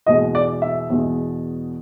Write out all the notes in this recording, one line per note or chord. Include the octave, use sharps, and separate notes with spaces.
E2 B2 G#3 D#5
D5
E5
E2 B2 G#3